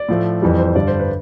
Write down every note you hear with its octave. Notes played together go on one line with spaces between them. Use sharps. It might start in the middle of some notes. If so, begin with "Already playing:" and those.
Already playing: D5
A2 F3 A3
F2 E3 G3
C5
G2 D3 G3 D5
C5
B4